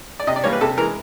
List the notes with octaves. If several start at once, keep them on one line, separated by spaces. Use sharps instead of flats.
D5
C3 D#5
D5
E3 G3 A#3 C#5
B4
C3 A4
E3 G#3 A#4